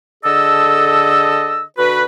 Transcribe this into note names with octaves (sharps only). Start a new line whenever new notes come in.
D3 G#4 A4 D#5 E6
D3 F#4 B4